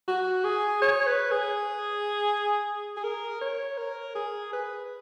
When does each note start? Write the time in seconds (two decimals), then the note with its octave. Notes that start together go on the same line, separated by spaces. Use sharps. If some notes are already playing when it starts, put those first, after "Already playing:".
0.08 F#4
0.44 G#4
0.82 C#5
1.07 B4
1.31 G#4
2.97 G#4
3.04 A#4
3.42 C#5
3.78 A#4
4.15 G#4
4.53 B4